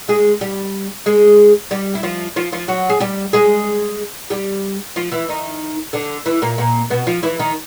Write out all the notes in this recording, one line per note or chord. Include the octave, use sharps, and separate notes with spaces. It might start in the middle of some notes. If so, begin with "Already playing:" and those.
G#3 G#4
G3 G4
G#3 G#4
G3 G4
E4
F3 F4
F3 F4
F3 F4
F#3 F#4
G#4
G3 G4
G#3 G#4
G3 G4
F3 F4
E3 E4
D#3 D#4
D3 D4
E3 E4
A#2 A#3
A#2 A#3
B2 B3
F3 F4
E3 E4
D#3 D#4